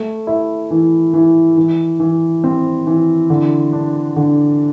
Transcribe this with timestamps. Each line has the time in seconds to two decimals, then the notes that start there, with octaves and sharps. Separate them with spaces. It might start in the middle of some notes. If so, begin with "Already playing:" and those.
Already playing: A3
0.27 E4
0.71 E3
1.14 E3
1.57 E3
2.00 E3
2.44 C4
2.87 E3
3.30 D3
3.73 D4
4.16 D3